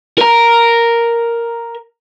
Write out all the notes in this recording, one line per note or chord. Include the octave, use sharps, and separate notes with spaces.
A#4 A#5